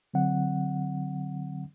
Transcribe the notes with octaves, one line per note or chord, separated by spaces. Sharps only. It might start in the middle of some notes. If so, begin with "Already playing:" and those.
D3 F#3 C4 F#5